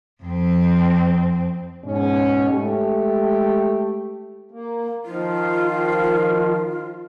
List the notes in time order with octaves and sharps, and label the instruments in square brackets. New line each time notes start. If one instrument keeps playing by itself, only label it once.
[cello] F2 C4
[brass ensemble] G#2 B2 C#4
G#3 A3 G4
[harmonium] A#3
[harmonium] D#3 F3 [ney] F4